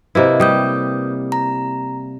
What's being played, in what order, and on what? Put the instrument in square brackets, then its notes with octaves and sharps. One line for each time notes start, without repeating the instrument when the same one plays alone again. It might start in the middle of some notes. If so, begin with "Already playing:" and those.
[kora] C3 A#3 E4 [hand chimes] B4 D#5
[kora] G3 [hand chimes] B4 D#6 G6
[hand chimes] A#5